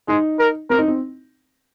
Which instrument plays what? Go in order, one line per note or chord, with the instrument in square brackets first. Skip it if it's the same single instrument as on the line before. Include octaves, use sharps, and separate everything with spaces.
[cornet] G#3 [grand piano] D#4
[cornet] A#4
[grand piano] C4 [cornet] A#4
[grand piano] D#4
C4